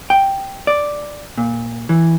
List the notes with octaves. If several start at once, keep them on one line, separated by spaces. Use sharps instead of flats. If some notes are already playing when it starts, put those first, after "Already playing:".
G5
D5
A#2
E3